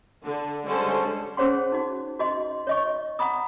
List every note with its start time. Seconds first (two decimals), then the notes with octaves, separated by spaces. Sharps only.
0.23 D3
0.65 D3 G3 G#3 C#4 A4 C5
1.37 C#4 G#4 C5 C#5 F#5 C6
1.72 D#4 F#4
2.19 F#4 D#5 C6
2.67 C#5 D#5 C#6
3.19 F#5 A#5 B5 D#6